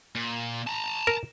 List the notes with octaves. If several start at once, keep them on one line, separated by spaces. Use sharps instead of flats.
A#2
A5 A#5
A#4